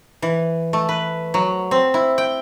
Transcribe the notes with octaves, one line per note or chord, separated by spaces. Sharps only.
E3
A3
B4
F#3
C4
E4
G5